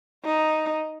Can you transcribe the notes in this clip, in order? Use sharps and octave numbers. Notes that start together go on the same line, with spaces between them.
D#4